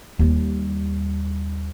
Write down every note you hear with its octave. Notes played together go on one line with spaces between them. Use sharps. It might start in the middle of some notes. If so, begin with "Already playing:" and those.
D#2 G3